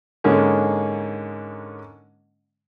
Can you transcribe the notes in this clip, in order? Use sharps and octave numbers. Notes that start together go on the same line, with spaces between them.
G#2 D3 G#3 A#3 C#4